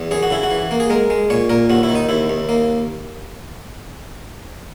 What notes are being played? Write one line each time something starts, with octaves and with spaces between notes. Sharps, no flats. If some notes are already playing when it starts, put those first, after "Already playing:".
Already playing: E2
F#2 G#4
F#4
C#3 E4
F#4
E3
A#3
G#4
G#3 A#4
G#3
A#2 C#5
A#2 A#4
D#2 F#4
E4
D#3
D#4
D#2 E4
D#2
A#3